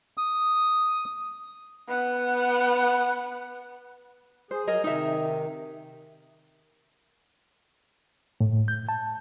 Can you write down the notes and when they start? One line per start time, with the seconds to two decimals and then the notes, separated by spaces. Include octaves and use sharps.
0.17 D#6
1.88 B3 F#5
4.51 G#4 C5
4.67 F#3 G#4 A#4 D#5
4.84 C3 D#3 D#4 E5
8.41 A2
8.68 G6
8.89 A5